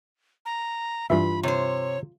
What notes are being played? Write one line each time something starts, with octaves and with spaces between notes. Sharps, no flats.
A#5
G2 E3 F4 E5 B5
C3 C5 C#5